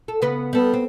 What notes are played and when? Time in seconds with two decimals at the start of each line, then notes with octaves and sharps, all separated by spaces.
0.08 A4
0.22 C#3 B3 B4
0.53 G3 B3 A4
0.74 C4